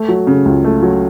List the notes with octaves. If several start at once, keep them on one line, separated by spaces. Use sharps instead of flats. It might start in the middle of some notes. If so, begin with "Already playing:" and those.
Already playing: A3
F#3
C#3
C#2
A3
F#3